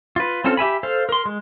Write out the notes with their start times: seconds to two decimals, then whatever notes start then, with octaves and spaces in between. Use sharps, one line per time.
0.16 F4 B4
0.44 C4 C#4 F4 A4
0.57 G4 E5 G#5 B5
0.83 A4 C5 F5
1.09 A#4 C6
1.26 G#3